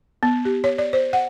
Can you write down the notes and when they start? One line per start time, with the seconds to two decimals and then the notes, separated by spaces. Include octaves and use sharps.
0.23 B3
0.45 G4
0.64 C#5
0.78 D5
0.93 C5
1.13 F#5